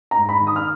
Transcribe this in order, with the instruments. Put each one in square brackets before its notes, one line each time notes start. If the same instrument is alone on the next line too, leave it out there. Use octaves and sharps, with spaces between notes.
[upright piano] A#5
G#2
B5
D#3
D#6
F6